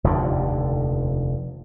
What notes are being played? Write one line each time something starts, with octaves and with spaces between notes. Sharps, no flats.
F1 D#2 A2 D3